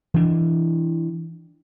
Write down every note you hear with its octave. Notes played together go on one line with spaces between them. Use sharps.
E3 D4